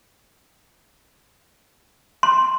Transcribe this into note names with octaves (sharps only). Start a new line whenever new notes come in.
C6